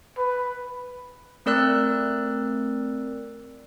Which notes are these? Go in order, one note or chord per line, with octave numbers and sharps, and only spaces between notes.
B4
A3 C4 A#4 D5 E6 F#6